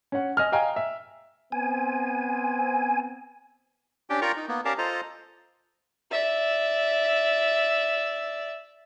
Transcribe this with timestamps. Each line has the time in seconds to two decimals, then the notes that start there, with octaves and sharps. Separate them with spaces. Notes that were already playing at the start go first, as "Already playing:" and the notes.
0.12 C#4 F#5
0.37 D#5 G#5 F6
0.52 D#5 F5 G5 G#5 A#5
0.76 E5
1.52 B3 C4 G#5
4.10 C#4 D4 G4 G5
4.22 F4 A#4 D5 G5 A#5 C#6
4.37 D#4
4.48 A#3 B3
4.65 C#4 G4 A#4 D5 F5 A5
4.78 F4 A4 C5 D#5 A#5
6.11 D5 E5